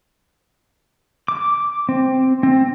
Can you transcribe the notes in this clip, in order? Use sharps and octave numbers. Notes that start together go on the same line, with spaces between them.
D6
C4
C4